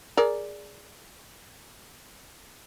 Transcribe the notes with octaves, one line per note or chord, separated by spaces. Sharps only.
G#4 A#4 D5